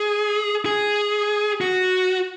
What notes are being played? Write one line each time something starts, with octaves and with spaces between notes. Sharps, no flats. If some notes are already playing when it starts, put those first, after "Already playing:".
Already playing: G#4
G#4
F#4